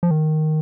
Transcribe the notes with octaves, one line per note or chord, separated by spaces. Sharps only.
F3
D#3